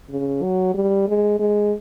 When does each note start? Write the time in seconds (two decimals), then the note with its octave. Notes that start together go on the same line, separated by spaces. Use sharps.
0.10 C#3
0.43 F#3
0.74 G3
1.08 G#3
1.39 G#3